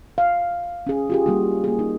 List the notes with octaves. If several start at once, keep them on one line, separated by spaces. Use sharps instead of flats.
F5
C#4 G#4
F4 G4 G#4
G3 A#3 F#4
A#3 G#4
D#4